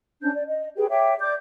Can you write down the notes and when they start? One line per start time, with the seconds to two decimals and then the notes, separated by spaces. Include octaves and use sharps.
0.21 C#4 D4 C5 G6
0.35 D5
0.47 D#5
0.77 G4 G#4 B4 G5
0.89 C#5 E5 G5 D6
1.19 D5 D6 G6